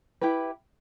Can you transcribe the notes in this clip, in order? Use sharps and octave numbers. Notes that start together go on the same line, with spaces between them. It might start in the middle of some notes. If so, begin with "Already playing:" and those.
E4 G4 B4